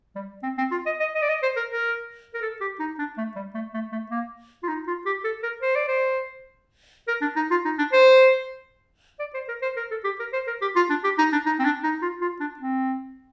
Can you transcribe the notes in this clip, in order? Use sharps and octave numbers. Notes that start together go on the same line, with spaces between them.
G3
C4
C4
F4
D#5
D#5
D#5
D5
D#5
C5
A#4
A#4
A#4
A4
G4
D#4
D4
A3
G3
A3
A3
A3
A#3
F4
D#4
F4
G4
A4
A#4
C5
D5
C5
A#4
D4
D#4
F4
D#4
D4
C5
D5
C5
A#4
C5
A#4
A4
G4
A#4
C5
A#4
G4
F4
D4
G4
D#4
D4
D#4
C4
D4
D#4
F4
F4
D4
C4